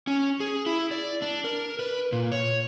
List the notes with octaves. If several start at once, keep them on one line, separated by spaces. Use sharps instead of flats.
C#4
G#4
E4
D5
D4
A#4
B4
A#2
C#5